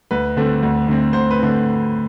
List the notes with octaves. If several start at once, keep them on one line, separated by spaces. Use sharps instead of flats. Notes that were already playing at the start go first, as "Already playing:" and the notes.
D2 B4
D3 A3 C4
D2
D3 A3 C4
D2 C5
B4
D3 A3 C4